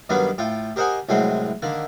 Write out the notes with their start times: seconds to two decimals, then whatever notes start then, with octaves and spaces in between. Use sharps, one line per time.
0.09 G2 D#3 F#3 A#3 B3 F5
0.38 A2 F4 G5
0.76 G4 A#4 C5 D#5 F#5 G#5
1.09 C2 A2 F#3 G#3 C4 C6
1.62 D3 D#3 A#3